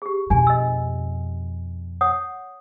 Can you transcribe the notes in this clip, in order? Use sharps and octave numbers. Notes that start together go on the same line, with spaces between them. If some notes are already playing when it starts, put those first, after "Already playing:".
G4 G#4
F2 B2 D4 G#5
D#5 E6
C#5 F#5 D#6